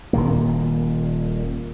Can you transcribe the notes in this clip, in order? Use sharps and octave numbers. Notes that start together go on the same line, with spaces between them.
D#1 A#2 D#3 A#3